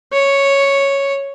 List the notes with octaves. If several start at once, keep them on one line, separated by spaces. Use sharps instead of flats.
C#5